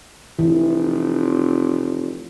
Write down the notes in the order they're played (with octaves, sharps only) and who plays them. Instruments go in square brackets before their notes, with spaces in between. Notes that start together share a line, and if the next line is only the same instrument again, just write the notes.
[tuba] F1 [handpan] E3